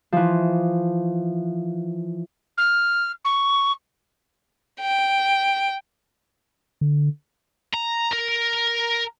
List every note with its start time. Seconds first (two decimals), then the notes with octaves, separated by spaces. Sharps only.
0.12 E3 F3
2.58 F6
3.25 C#6
4.80 G5
6.81 D3
7.74 A#5
8.13 A#4